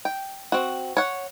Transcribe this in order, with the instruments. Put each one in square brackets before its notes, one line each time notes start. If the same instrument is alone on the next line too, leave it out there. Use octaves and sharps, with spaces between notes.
[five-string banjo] G5
C4 F#4
C#5 F#5